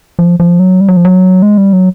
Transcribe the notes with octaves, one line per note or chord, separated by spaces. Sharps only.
F3
F3
F#3
G3
F#3
F3
F#3
G#3
G3
F#3